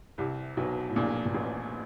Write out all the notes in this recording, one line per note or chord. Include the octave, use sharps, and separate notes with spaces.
C2 C3
B1 B2
A2
A#1 A#2
A#2
A1 A2